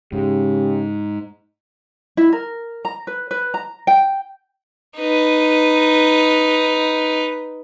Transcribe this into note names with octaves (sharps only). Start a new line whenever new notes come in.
G#2 C#3 G4
E4
A#4
A#5
B4
B4
A#5
G5
D#4 B4